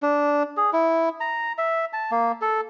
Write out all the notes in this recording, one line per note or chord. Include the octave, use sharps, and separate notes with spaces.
D4
G#4
E4
A#5
E5
A5
A#3
A4